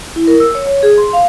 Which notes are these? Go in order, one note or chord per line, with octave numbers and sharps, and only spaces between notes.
E4
A#4
E6
C#5
C#5
G#4
C6
F5